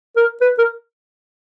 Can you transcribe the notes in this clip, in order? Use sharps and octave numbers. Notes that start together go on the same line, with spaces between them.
A#4
B4
A#4